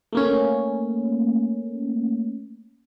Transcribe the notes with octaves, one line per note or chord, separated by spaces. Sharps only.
A3 A#3 C#4